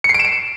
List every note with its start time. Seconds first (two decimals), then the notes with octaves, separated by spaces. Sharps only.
0.04 C#7
0.09 C7
0.14 D7
0.20 E7
0.25 D7